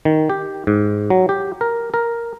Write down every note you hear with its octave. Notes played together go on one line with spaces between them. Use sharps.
D#3
G4
G#2
F#3
G4
A#4
A#4